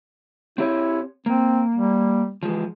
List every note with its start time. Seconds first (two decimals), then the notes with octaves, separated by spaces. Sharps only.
0.58 C4 E4 G4 C#5
1.26 A#3 C4
1.75 G3
2.43 E3 F3 G#3